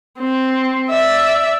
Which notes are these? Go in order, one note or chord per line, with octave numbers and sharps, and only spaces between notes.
C4
D5 E5